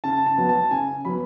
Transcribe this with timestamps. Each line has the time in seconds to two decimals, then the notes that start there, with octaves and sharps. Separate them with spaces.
0.04 C#3 A5
0.27 A5
0.38 F#3 B3
0.49 A5
0.71 C#3 G#5
1.05 F#3 B3 B5